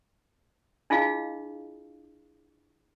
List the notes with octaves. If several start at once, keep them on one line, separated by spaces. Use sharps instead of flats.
D4 E4 F4 G#4 D#5 F5